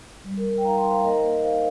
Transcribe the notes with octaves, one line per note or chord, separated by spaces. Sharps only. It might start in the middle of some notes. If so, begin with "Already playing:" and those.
G3
A#4
G3
A#4
G5
D#4 F5 A#5
G5 C6
D#4
C5 F5
A#3 A#4 D#5
A#3
D#4 C5 F5